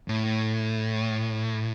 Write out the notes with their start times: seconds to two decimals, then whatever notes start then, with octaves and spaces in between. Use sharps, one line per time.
0.08 A2